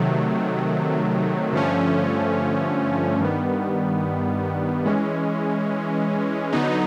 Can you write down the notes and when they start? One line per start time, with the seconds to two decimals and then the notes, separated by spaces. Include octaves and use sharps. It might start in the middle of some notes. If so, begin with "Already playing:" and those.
Already playing: C3 D#3 F#3 A3
1.53 G2 D3 F3 A3 C#4
3.19 G2 D#3 G3 B3
4.86 E3 G#3 C#4
6.52 D3 F#3 B3 D#4